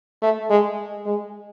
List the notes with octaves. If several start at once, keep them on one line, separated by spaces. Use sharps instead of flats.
A3
G#3
G#3